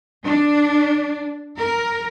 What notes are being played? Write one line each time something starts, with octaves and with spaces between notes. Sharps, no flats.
D4
A#4